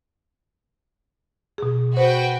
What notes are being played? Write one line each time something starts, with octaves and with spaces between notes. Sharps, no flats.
B2 G#4
F#4 B4 C5 G5